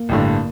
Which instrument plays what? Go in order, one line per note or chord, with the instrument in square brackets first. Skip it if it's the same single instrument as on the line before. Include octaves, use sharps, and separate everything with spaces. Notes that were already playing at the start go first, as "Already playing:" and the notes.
Already playing: [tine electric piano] A#3
[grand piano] A1 G2 D3